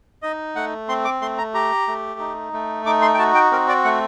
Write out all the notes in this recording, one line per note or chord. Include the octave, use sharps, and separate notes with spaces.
D#4 D#5
A3 F#5
C4 C6
D6
A3 C6
A#5
G4 A#5
A3
D#4
A3
D#4 D6
C6
G5
F#4 A5
G5
C4 A#4
D5
A3 F#5